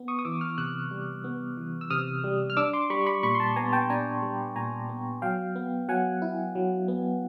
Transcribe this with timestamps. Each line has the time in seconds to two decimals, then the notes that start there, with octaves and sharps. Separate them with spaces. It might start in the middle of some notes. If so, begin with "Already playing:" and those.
Already playing: B3
0.08 C#6 D#6
0.19 D#6
0.25 E3 D6 E6
0.41 D#6 F6
0.58 C3 E6 F#6
0.91 G3
1.24 B3
1.57 E3
1.81 E6
1.90 C3 D#6 F6
2.24 G3
2.50 F6
2.57 D4 D6 E6
2.73 C6 D6
2.90 G3 B5 C#6
3.06 B5 C#6
3.23 A#2 B5 C#6
3.35 C6
3.40 A5 B5
3.56 B3 G#5 A#5
3.72 G5 A5
3.90 D4 G#5 A#5
4.23 G3
4.56 A#2 G#5 A#5
4.89 B3
5.22 F#3 F5 G5
5.56 B3
5.89 F#3 F#5 G#5
6.22 E4
6.55 F#3
6.88 B3